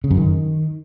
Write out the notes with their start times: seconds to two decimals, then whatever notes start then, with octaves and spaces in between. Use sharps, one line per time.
0.04 C#3
0.11 F#2
0.17 D#3